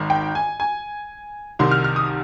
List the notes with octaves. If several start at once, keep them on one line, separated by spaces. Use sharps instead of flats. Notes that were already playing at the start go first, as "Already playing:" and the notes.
Already playing: G#1 G#2 D#3
G5
G#5
G#5
C2 C3 D#3 C6
F6
F6
D#6